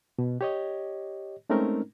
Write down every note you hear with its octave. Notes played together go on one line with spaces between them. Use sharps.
B2
G4 C#5 D#5
G#3 A3 C4 C#4 D#4 A#4